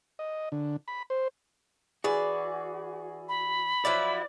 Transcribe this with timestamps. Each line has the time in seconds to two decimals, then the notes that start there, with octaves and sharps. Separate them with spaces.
0.19 D#5
0.52 D3
0.88 B5
1.10 C5
2.04 E3 F#4 G#4 D5
3.29 B5
3.85 F3 F#3 E4 D5